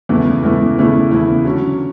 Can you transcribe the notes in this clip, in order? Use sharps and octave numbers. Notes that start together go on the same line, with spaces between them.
E2 C#3 E3 A3 E4
E2 C#3 E3 A3 E4
E2 C#3 E3 A3 E4
E2 C#3 E3 A3 E4
D3 F#3 C#4